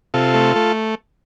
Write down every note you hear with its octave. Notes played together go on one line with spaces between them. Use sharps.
C3 F4 A4
A3
A3